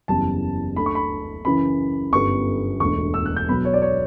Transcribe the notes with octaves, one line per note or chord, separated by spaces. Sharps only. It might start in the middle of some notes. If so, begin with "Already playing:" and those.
F#1 E2 C#3 G3 A5
D2 D3 A3 B5
C#6
B5
F#2 C#3 E3 B5
G1 F#2 D3 G3 B3 C#6
E1 D2 D3 C#6
E6
F#6
G6
B1 B2 F#3 B3 B5
C#5
D5
C#5